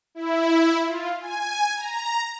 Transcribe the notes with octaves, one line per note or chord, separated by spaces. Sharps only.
E4
F4
G#5
A#5